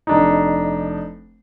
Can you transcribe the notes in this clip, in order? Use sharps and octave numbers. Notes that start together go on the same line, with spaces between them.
F1 D4 D#4